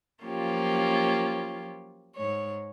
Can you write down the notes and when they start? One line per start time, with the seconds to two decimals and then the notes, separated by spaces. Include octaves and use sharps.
0.23 F3 F#3 A#3 C#4 F4 G4
2.16 G#2 C#5